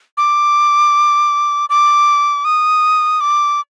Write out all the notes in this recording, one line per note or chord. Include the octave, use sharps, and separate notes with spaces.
D6
D6
D#6
D6